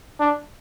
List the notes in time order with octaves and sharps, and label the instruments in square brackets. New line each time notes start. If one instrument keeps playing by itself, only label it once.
[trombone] D4